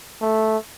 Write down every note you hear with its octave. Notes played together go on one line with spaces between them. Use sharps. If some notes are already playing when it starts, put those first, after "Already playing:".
A3